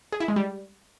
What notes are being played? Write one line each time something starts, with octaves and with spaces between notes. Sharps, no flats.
G#4
E4
G#3
G3